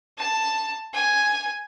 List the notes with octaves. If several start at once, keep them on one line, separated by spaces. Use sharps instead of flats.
A5
G#5